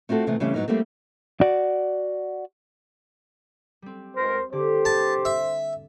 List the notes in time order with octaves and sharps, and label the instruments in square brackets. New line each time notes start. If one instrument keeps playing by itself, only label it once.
[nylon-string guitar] A3 C4 F4 F#4 A4
C3 E3 A3 B3
C#3 E3 G3 A3 C4
G#2 F#3 A#3 B3 D#4
G3 A3 A#3 C4
[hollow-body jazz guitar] F#4 D5
[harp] G3 C4
[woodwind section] C#2 A#4 [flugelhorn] C5
[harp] D3 D5 [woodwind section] G4 [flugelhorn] C5
[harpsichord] A5
E5